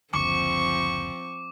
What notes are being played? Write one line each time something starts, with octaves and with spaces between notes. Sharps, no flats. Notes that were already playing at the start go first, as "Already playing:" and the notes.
F#1 D2 F3 C4 C#6 D6